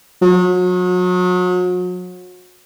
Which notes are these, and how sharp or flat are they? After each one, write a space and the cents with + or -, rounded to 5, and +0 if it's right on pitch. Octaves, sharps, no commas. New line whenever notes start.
F#3 -35